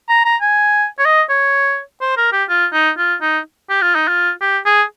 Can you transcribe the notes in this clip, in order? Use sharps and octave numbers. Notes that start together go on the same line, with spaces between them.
A#5
A#5
G#5
C#5
D#5
C#5
C5
A#4
G4
F4
D#4
F4
D#4
G4
F4
D#4
F4
G4
G#4